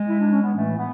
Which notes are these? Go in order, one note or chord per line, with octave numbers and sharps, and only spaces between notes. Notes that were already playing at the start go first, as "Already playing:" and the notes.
Already playing: G#3
E4
D4
C#4
B3
A2 E3 A3
B3